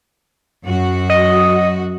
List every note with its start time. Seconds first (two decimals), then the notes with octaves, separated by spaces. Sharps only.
0.66 F#2 F#4
1.10 D#5